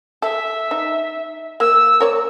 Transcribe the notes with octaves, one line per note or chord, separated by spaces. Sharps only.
A4 E5
D#4
A#3 E6
A#4 C#5 D5